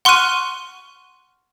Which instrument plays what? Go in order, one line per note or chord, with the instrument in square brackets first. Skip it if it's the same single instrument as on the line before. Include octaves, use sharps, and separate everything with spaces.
[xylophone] F#5 C6 C#6 F6 F#6 D#7